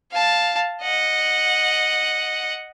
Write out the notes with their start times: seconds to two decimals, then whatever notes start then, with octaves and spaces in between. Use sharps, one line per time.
0.12 F5 A5
0.82 D#5 F#5